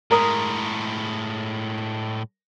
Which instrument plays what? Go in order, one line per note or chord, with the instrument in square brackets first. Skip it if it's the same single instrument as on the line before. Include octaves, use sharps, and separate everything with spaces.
[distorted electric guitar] A2 G#3 [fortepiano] A#4 A#5 D#6